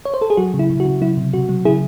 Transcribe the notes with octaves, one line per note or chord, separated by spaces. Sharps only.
C#5
C5
A4
G#4
F#3 F#4
C#3
E4
C#3
F#4
C#3
F#3 E4
C3
C3 F#4
F#3
C#3 E4 G#4